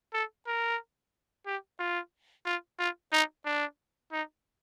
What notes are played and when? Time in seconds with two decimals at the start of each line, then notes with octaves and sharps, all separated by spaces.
0.13 A4
0.47 A#4
1.46 G4
1.79 F4
2.46 F4
2.79 F4
3.12 D#4
3.45 D4
4.12 D#4